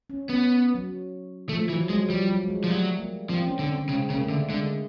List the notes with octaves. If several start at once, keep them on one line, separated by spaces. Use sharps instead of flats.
C#4
B3 C#4
F#3
F3 A3
E3 F#3
F#3 G#3
F3 G3
F#3
G#3
G3
F3
F#3 A3
A#3
F3 C4
C#4
D3 C4
C4
C#3 G#3
C#3 A#3
A3
D3
D3 G#3